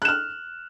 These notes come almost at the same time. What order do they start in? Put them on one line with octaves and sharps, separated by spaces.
F#6 E7 F6